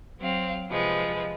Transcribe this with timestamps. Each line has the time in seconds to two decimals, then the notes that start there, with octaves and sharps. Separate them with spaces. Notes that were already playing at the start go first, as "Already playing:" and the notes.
0.18 F#3 C4 F5
0.69 C3 F3 G#3 B4